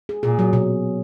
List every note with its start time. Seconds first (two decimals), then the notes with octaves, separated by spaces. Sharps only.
0.09 G#4
0.23 A#2 G#4
0.39 F#3
0.53 B2